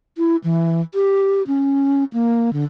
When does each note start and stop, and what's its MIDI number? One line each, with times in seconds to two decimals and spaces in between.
0.18 0.36 64
0.44 0.81 52
0.94 1.42 67
1.47 2.04 61
2.13 2.53 58
2.53 2.64 50